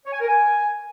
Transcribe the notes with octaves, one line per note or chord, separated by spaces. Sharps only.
C#5
G#5
A#4
G#5